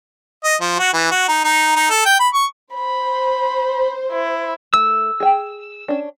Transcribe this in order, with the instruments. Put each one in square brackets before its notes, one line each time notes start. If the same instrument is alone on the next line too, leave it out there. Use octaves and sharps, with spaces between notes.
[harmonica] D#5
F3
F#4
E3
F#4
D#4
D#4
D#4
A4
G5
B5
C#6
[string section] C5 [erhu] B5
[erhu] E4
[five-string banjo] A3 [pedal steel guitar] E6
[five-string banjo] G#4 G5
C#4 D4